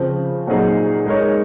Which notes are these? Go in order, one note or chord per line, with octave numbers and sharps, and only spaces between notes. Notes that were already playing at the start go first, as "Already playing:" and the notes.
Already playing: C#3 F3 C4
A#2 F#3 C4 D#4 G#4
G#3 D#4 A#4 C#5